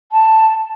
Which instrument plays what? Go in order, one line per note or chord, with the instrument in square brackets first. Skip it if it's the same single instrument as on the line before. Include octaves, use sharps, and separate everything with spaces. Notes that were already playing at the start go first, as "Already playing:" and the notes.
[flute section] A5